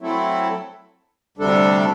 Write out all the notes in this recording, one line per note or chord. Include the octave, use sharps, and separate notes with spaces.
F#3 A3 C4 E4 A4
D2 C3 G3 D4 A4